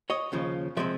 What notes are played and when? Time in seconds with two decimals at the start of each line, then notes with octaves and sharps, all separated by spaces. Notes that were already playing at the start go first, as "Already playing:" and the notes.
0.10 C#5 D#5
0.32 D#2 C#3 F3
0.77 C3 F3 G#3 C4 D5 E5